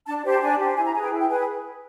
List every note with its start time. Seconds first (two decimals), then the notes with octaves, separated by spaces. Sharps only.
0.07 D4 A5
0.25 G4 C5
0.30 A5
0.42 D4 G#5
0.59 G4 C5
0.76 E4 G#5
0.86 A#5
0.95 G#4 B4 G#5
1.03 G5
1.12 E4
1.21 G5
1.29 G#4 B4 G#5